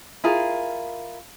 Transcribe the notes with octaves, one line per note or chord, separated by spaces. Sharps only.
E4 F4 G#4 A#4